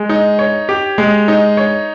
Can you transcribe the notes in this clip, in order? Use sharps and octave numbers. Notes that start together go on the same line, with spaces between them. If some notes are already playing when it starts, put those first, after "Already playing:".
Already playing: G#3
D#4
C#5
G4
G#3
D#4
C#5